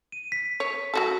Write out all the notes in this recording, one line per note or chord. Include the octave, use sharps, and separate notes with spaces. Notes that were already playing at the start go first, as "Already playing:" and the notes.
D#7
B6
C#5
F#3 F#4 A4